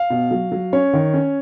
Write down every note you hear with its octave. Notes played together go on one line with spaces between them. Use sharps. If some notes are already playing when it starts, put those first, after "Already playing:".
Already playing: F5
B2
F#3
F#3
C#4 C#5
D#3
C#4